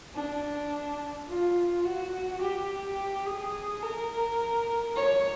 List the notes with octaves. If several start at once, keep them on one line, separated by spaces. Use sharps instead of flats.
D4
F4
F#4
G4
G#4
A#4
C#5